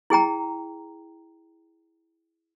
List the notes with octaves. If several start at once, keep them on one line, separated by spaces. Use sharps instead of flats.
E4 G#4 G5 A#5